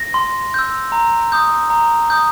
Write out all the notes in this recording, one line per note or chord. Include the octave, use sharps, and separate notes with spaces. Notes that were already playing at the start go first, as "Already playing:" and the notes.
Already playing: A#6
C6
E6 G6
A#5
D#6 G6
A#5
D#6 G6